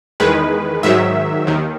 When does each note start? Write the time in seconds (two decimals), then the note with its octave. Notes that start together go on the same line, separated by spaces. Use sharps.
0.20 E2 D#3 G#3 B4
0.83 G#2 D#3 F#3 E5
1.47 D#2 D#3